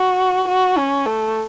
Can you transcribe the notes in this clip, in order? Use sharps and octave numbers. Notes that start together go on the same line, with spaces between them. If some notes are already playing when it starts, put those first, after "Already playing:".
Already playing: F#4
F#4
C#4
A3